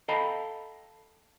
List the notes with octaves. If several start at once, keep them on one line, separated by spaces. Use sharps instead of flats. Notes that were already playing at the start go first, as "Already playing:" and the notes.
A4 D#5 F5 G5 A#5 B5